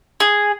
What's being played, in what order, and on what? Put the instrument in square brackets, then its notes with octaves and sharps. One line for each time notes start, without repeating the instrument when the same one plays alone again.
[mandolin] G#4